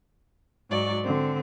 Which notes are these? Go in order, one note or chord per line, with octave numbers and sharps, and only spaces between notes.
G#2 F#3 D5 C#6
D3 C4